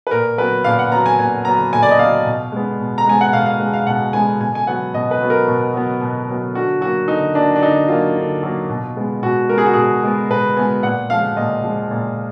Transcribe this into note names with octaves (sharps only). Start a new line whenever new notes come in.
B4
A#2 A#4
F#3 B3 B4
A#2 F5
F#5
F#3 B3 A#5
G#5
A#2 G#5
F#3 B3 A#5
A#2 G#5
D5
D#5
F#3 B3 F5
B2
G#3 B3
B2
A#5
G#3 B3 G#5
F#5
B2 F5
F5
G#3 B3
F5
B2 F#5
G#3 B3 G#5
B2 G#5
G#5
F#3 B3 F#5
B2 D#5
B4
F#3 B3
A#4
B2
F#3 B3
B2
F#3 B3
D3 F#4
F#3 A#3 F#4
D3 D#4
F#3 A#3 D4
D4
D3 D#4
F#3 A#3 F4
D3
F#3 A#3
B2
G#3 B3
B2 F#4
G#3 B3 G#4 A#4
F#4
B2 G#4
G#3 B3
B2 B4
G#3 B3 G#5
A#2 F#5
F3 G#3 F5
A#2 D#5
F3 G#3
A#2